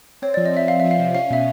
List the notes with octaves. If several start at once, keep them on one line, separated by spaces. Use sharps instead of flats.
C4 C#5
F3 D5
D#5
F3 E5
F3 F5
F3 E5
F5
C3 E5
C#4 F5
B2 E5